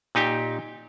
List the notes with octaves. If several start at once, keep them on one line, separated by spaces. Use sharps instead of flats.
A#2 D#4 G4 G5